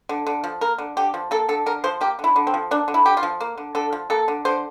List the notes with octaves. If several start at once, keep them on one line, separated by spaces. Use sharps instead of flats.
D3
D3
F3
A#3 A#4
D3
D3 G4
F3
A#3 A4
D3 A4
D3 A#4
F3 C5
A#3 G4
D3
E4
D3
C4
F3
A#3 D4
D3
E4
D3 G4
F4
F3
A#3
D3
D3 A4
F3
A#3 A4
D3
D3 C5